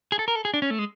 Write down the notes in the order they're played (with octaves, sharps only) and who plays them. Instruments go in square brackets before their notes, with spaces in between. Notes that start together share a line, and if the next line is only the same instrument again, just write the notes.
[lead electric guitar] G#4
A4
A#4
A4
G#4
D4
C#4
A3
G#3